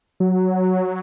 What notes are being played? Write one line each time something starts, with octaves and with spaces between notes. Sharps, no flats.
F#3